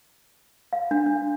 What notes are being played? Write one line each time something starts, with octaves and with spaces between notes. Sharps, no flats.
F5
D4
D4